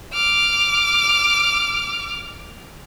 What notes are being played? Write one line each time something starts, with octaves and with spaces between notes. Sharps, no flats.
D6 F6